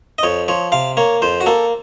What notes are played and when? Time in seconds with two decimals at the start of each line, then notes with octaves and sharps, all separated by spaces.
0.18 D#5
0.23 F2 C#5
0.48 F3 C#5
0.72 C3 F5
0.97 A#3 C#5
1.22 F2 C5
1.41 F#4
1.46 A#3 A4